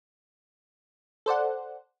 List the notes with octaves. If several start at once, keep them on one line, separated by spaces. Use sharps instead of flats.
A4 C5 D5 F#5